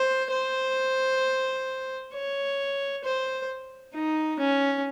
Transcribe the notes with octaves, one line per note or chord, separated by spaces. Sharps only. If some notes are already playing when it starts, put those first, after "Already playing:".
Already playing: C5
C5
C#5
C5
D#4
C#4